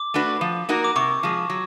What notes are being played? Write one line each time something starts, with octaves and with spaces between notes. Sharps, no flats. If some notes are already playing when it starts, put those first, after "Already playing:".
Already playing: D6
A3 D4 F#4 B4
F3
A#3 D#4 F#4 A#4
D6
C3 C#6
F3 G#3
F#3